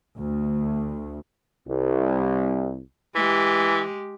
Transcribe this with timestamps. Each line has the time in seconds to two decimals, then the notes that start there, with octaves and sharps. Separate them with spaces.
0.19 D2
1.67 C2
3.15 E3 G#3 G4